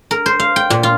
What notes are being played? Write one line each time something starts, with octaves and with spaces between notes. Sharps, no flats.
A#4
C5
F5
G5
A#2
F4